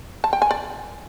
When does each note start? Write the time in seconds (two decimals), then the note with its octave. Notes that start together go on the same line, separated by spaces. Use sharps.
0.24 A5
0.33 G5
0.42 G#5
0.51 D5